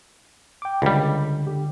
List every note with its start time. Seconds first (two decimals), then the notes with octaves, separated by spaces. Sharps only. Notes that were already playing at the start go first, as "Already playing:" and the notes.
0.62 G5 D6
0.82 C#2 D3 G3
1.47 D3 G4